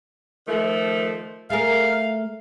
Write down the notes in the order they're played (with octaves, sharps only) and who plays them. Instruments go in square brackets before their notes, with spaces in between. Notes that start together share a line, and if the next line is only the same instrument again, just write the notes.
[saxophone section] D#3 F3 A3
[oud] A3 G#4 A#4 [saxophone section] F5